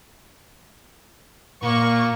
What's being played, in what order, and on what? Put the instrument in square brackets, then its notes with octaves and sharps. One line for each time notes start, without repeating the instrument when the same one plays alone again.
[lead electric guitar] A#2 [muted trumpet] A#3 [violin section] C#6